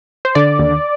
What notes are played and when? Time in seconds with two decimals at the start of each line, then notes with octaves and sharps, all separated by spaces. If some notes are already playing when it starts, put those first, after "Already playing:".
0.25 C5
0.35 D3 D5
0.59 D#2